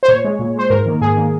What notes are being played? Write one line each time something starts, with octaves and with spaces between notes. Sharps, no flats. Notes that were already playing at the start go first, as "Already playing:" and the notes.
C5
A#2 C#5
G#3
A#2
G#3 C5
G#2 A#4
D#3 A#3
G#2 G#4
D#3 A#3